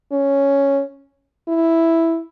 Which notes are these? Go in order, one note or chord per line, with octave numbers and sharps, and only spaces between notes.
C#4
E4